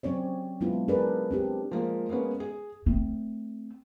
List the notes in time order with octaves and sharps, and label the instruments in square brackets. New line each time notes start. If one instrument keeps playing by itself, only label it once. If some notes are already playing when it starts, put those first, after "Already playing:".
[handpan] F#3 C4 C#4 C#5 D5
F#3 G#3 B3 D4 E4 F4
C#4 D4 G#4 A#4 B4 D5
C4 D4 G4
[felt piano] F3 G#3 A#3
G#3 A#3 B3 C#4
G#4
[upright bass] A3 C4